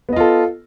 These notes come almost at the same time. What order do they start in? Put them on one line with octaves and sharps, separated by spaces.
B3 D#5 F4 A4